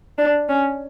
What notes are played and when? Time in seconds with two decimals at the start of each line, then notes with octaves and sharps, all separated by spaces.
0.18 D4
0.49 C#4